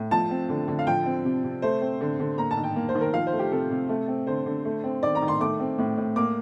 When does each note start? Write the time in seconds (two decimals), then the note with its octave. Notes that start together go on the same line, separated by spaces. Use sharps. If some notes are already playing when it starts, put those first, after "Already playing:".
Already playing: A2
0.11 F3 A5
0.30 C4
0.49 D3
0.68 D3
0.79 F5
0.87 F3 G5
1.06 C4
1.25 C3
1.44 C3
1.62 A3 C5
1.81 C4
2.01 D3
2.19 D3
2.38 A#3 A#5
2.51 A5
2.57 D#3
2.64 G5
2.76 A#3
2.89 C5
2.95 D#3
3.01 A#4
3.14 F3 F5
3.27 C5
3.33 A3
3.39 G4
3.52 C3 A4
3.71 C3
3.89 A3
4.08 C4
4.27 D3 C5
4.46 D3
4.65 A3
4.84 C4
5.03 D#3 D5
5.15 A#5
5.22 D#3
5.28 C6
5.40 A3 D6
5.60 C4
5.78 A2
5.97 A2
6.16 A#3 D6